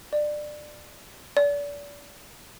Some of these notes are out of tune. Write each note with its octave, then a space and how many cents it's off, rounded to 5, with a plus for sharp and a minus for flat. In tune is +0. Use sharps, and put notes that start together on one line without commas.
D5 +20
D5 -35